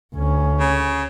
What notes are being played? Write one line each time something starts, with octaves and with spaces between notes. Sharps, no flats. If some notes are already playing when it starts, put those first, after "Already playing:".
D2 C#4
C#3